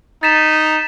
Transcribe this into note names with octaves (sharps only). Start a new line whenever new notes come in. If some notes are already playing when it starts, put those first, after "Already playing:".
D#4 A6 B6 E7